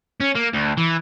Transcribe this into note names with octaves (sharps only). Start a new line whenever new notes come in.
C#4
A#3
D2
E3